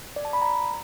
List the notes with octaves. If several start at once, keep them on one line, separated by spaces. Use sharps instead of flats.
D5
A5
B5
A#5